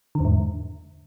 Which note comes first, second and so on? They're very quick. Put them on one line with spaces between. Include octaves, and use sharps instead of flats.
D3 E2 G#2